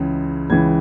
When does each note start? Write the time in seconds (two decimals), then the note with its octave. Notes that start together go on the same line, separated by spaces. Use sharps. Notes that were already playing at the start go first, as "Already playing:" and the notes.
Already playing: C#2 C#3 E3 G#3
0.50 C#2 C#3 E3 G#6